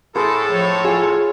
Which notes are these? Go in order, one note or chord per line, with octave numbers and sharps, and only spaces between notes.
A2 G#4 A4 C5
F3 C#5
F4 G#4